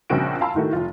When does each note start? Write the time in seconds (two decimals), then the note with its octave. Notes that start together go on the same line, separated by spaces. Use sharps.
0.10 A#1 A#2 C#3 C4 F#4 D7
0.41 F5 G#5 A5 B5 C6 E6
0.55 A2 D#3 A3 F#4
0.73 F1 F4